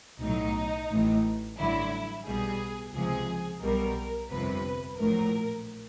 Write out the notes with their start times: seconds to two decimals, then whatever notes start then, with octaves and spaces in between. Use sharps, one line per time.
0.20 B1 A2 F#3 D#4
0.89 A1 A2 E3
1.56 A1 G2 D3 F#3 E4
2.25 B1 B2 G3 G#4
2.93 C#2 C3 F3 G#4
3.61 B1 B2 G3 A#4
4.30 G1 F2 C3 B4
4.98 A#1 A2 F#3 A#4